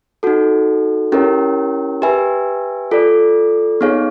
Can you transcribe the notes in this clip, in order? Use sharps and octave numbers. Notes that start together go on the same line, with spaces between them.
D#4 F#4 A4
C#4 E4 G4 A#4 C#5
G4 B4 E5 G#5
F4 A4 D5
B3 D#4 G#4 C#5 F5